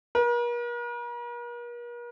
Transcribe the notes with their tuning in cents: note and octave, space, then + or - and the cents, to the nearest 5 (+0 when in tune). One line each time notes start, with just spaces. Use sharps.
A#4 +45